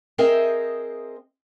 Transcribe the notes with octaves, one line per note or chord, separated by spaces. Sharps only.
C4 G#4 A#4 C5 D#5 E5